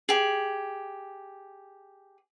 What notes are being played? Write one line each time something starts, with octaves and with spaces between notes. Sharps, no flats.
G4 G#4